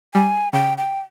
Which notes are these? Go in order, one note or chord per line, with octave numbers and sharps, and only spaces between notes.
G3 G#5
C#3 G5
G5